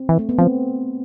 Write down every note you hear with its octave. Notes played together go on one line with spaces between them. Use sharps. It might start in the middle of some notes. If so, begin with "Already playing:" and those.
Already playing: C4
E3
A3
B3
F3 C4